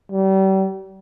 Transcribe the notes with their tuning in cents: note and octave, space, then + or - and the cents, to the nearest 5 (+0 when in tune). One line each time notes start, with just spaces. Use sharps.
G3 -35